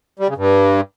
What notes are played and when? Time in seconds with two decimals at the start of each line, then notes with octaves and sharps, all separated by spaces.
0.19 G3
0.28 C#3
0.37 G2